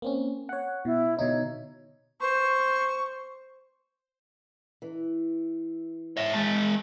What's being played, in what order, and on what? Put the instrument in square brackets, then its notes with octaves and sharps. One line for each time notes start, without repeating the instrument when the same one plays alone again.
[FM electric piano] A#3 C4 C#4
C#5 F#5
[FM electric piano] B2 [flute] E4
[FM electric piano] B2 D3 D#4 [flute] C#5
[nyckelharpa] C5 [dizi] C#6
[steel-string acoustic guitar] E3
[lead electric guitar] C#5 E5
G#3 A5